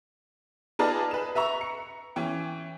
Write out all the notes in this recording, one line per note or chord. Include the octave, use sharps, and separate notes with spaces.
D#4 F4 G#4 B4 D5 A5
B4 E7
B4 E5 A#5 C#6
C#7
E3 C#4 G5